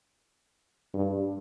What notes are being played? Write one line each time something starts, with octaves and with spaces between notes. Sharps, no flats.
G2